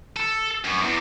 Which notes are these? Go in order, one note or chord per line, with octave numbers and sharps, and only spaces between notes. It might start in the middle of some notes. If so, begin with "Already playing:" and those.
A4
F#2
E2